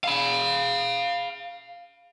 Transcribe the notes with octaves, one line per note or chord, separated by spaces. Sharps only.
F5 B5